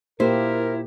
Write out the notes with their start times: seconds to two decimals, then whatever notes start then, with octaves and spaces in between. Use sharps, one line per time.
0.20 A#2 A#3 E4 G4 A#4 C5